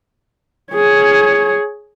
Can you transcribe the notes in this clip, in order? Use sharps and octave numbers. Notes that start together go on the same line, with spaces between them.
G#4 C#5